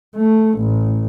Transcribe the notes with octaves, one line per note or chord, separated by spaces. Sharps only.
A3
A1